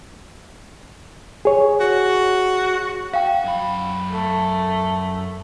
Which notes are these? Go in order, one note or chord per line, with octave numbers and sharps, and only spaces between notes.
G#4 C#5
F#4
F#4 F5 G5
F#2 B5
A3